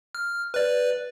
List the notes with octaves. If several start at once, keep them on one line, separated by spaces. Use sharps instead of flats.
F6
B4 D5